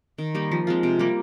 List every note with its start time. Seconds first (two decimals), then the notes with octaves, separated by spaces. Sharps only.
0.18 D#3
0.35 G3 A#3 D#4
0.52 F3
0.67 G#3 C4 F4
0.83 C3
0.99 G3 A#3